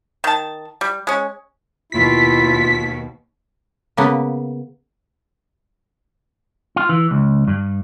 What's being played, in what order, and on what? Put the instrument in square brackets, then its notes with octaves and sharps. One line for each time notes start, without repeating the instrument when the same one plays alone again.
[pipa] D#3 A5
G3
G#3 C#4
[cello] D#2 B2 [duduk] E4 [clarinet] F4 [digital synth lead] B6
[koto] C#3 A#3 B3
[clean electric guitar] F4
E3
C#2
G2